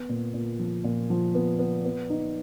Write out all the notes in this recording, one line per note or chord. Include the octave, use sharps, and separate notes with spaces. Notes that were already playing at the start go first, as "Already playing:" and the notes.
Already playing: B3
A#2
A#2
F3
A#2
F3
B3
B3
B3
D#4